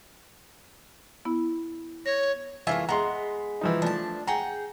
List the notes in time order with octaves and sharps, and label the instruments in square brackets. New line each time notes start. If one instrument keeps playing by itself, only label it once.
[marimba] B3 E4
[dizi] C#5 [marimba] A#6
[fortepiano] E3 E5 G#5 [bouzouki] A3 A#3 F4
[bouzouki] G#3 B3 [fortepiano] A#5 C6
[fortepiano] E3 F3 D#4
[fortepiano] F3 A3 [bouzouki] D4 A5
[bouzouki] G#4 F#5 G5 [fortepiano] A#5